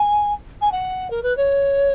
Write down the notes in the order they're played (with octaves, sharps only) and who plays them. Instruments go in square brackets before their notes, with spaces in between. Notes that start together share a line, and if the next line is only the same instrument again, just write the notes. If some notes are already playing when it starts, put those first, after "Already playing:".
Already playing: [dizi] G#5
G#5
F#5
A#4
B4
C#5